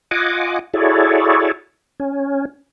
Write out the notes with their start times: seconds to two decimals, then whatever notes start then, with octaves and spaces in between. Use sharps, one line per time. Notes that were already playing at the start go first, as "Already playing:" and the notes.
0.11 F4 D#5 F#5 G#5 D6
0.74 E4 F#4 G#4 A4 C#5 D5
2.00 C#4